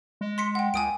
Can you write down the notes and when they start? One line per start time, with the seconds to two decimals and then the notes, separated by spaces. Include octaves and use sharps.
0.21 G#3
0.38 C6 B6 C#7
0.55 F#5 G5
0.74 C#2 G#5 D#6 D7